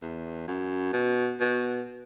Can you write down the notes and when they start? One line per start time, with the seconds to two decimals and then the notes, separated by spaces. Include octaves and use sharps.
0.02 E2
0.48 F#2
0.93 B2
1.40 B2